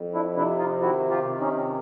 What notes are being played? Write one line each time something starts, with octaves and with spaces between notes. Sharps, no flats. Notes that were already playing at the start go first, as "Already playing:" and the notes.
Already playing: F2
D4 E4
C3 D4 E4
D#4 F4
D#3 E4 F#4
F4 G4
C3
C#4 D#4